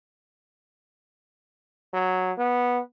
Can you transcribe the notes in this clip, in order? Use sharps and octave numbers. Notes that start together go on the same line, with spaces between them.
F#3
B3